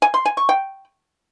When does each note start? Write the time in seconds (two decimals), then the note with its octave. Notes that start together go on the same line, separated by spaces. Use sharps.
0.02 G#5
0.14 C6
0.25 G#5
0.37 C#6
0.49 G5